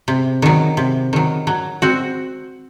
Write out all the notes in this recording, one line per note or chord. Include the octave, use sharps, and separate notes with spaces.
C3
D#3 F#3
C3
D#3 F#3
F#3
C4 F#4